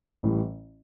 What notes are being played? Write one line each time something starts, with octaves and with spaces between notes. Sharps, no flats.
A1 A2 E3 G3